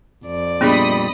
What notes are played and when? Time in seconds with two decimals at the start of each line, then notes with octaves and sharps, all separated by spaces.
0.24 F2 D5
0.61 A#2 G3 B3 D4 G#4 D#5 B5 D#6